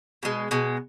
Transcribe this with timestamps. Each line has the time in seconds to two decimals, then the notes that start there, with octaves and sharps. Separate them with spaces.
0.23 B2 G#3
0.51 B2 G#3